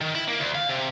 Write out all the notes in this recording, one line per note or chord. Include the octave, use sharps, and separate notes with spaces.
D#3
E4
A#3
D2
F5
C3